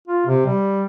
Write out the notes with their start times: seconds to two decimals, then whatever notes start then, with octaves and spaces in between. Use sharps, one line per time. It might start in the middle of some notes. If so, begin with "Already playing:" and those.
0.08 F4
0.26 C3
0.46 G3